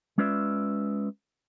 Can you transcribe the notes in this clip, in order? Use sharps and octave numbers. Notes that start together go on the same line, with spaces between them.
G#3 C#4 F4 B4 D5 E5